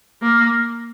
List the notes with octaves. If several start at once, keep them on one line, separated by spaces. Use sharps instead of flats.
A#3